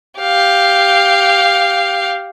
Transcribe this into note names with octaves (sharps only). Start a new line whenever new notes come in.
G4 F5